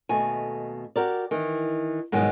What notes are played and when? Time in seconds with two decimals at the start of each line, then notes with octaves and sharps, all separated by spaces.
0.09 D#2 B2 A3 G#5
0.96 F#4 G4 A#4 D5
1.31 D#3 E3
2.12 G#2 B2 D#3 F#3 G3